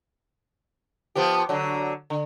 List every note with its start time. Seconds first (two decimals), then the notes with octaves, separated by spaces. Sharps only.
1.15 F3 B3 G4
1.49 D3 F#3
2.10 D3